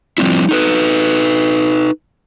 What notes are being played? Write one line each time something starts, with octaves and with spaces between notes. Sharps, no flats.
F3 G3 C4 D4 E4
D#4 A4 B4